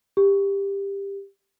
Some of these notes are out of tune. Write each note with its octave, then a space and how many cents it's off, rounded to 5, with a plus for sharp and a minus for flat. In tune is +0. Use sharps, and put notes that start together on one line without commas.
G4 +15